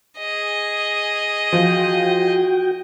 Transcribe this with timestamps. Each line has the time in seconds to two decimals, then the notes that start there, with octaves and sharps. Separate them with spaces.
0.18 G#4 D#5
1.52 F3 F#4 G5